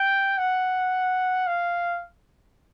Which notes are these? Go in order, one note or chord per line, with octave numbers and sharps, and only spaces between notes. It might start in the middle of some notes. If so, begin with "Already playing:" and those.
Already playing: G5
F#5
F5